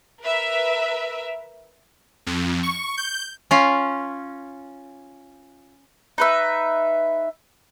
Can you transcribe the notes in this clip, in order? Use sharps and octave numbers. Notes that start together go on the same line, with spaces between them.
A#4 B4 E5
F2
C#6
G6
C#4 F4
D#4 B4 E5